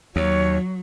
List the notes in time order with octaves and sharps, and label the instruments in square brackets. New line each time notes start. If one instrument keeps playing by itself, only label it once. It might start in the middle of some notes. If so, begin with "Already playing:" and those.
[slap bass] D#2 [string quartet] F#3 [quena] C#5